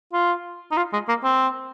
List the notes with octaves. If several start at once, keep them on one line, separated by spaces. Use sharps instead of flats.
F4
D#4
F4
G#3
A#3
C4